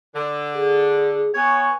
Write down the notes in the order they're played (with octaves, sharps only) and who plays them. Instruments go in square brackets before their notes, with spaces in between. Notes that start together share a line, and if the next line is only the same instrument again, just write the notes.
[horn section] D3
[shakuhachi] G#4
[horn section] B3 C#5 [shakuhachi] G#5